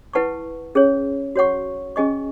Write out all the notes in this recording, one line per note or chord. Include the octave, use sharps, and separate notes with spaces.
E4 B4 F#5 A5 C#6
C#4 G#4 C#5
F#4 C#5 F#5 C#6
C#4 G#4 D#5 G#5 C#6